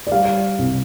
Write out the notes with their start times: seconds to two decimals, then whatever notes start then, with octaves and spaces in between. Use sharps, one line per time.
0.07 D5
0.12 G3 F5
0.59 C2